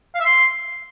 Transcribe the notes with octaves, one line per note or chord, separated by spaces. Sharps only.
F5
E5
C6